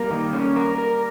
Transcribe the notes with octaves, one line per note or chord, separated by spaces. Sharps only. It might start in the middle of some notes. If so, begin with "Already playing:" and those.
Already playing: G3 A#3 A#4
D#3 A#3
C#4
A#4
A#4